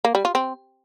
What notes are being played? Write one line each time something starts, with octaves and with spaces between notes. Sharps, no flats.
A#3
G3
F4
C4